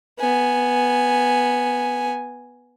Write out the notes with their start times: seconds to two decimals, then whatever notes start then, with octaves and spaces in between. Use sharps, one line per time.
0.20 B3 G#5